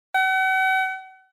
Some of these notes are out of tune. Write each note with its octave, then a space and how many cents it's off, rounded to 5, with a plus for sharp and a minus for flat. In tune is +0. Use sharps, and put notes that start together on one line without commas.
F#5 +40